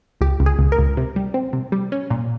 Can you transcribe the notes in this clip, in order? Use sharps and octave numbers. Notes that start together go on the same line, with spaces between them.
C#2 G4
C#2
G#4
C#2
A#4
C#2
C3
G3
C4
C3
G3
C#4
A#2